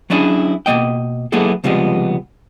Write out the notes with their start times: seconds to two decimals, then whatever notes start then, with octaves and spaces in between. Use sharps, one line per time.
0.10 F#3 C#4 D4 E4 G#4
0.66 B2 D#3 A#3 D#5 G5
1.32 F#3 A#3 B3 E4 G#4 A4
1.64 C#2 C3 F3 G3 G#3 B3